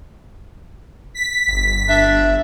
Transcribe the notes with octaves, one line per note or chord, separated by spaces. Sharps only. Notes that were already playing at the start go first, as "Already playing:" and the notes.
B6
G1
D4 E5